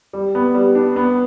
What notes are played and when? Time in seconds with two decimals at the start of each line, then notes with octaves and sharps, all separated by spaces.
0.13 G3
0.35 B3
0.55 G3
0.75 D4
0.96 B3